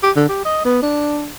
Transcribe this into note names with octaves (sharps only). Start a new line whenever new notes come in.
G4
D3
G4
D#5
B3
D4